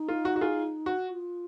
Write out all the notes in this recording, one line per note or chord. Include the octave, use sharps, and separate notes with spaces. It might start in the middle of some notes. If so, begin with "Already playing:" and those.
Already playing: D#4
F4
F#4
F#4
F4 G#4
F#4
F4